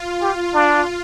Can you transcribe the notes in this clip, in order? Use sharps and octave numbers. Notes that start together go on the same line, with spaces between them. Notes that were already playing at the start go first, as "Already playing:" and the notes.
Already playing: F4
G4
D4